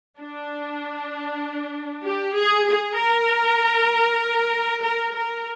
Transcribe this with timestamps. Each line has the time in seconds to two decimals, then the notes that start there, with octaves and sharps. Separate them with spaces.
0.19 D4
2.05 G4
2.36 G#4
2.67 G#4
2.98 A#4
4.84 A#4
5.14 A#4